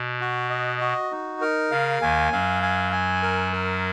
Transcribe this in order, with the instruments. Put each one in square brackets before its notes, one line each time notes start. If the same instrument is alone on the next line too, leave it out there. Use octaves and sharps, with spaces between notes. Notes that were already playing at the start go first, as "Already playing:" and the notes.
Already playing: [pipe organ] B2
[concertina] F#4
D#5
F#4
D#4
A#4
[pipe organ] C#3 [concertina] F5
[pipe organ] D#2 D#3 [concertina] G#5
[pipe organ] F#2 F#3 [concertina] F5
[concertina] G#5
G#5
A#4
A#4